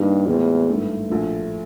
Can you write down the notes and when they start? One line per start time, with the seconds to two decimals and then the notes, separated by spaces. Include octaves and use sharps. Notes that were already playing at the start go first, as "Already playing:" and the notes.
Already playing: G2 D#3 G3 A#3 D#4 G4
0.26 E2 A2 E3 G#3 C4 F4
0.67 G#1 G2 E3 A3
1.10 A#1 A2 F3 A3